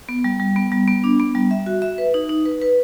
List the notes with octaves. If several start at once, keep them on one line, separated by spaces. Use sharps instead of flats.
B3
G3
G3
B3
G3
B3
D4
B3
G3
E5
F#4
E5
B4
D#4
D#4
B4
B4